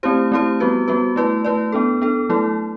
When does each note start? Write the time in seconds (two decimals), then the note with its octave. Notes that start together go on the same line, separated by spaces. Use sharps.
0.03 A3 C4 E4 G4 C5
0.32 A3 C4 E4 G4 C5
0.60 G3 B3 F#4 B4
0.88 G3 B3 F#4 B4
1.16 A3 E4 B4 D5
1.45 A3 E4 B4 D5
1.72 B3 D4 A4
2.01 B3 D4 A4
2.29 F#3 A3 E4 A4